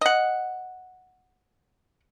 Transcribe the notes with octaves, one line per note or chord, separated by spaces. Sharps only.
D#5 F#5